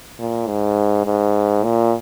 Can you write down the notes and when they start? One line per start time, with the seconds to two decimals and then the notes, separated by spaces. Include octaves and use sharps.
0.19 A#2
0.47 G#2
1.05 G#2
1.64 A#2